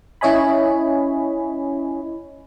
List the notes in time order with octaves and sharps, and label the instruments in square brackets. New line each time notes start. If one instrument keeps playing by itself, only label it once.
[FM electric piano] C#4 E4 C#5 D#5 G#5 B5